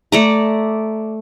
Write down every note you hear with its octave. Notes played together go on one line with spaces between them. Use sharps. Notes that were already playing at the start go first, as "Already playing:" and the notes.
A3 D5 A#5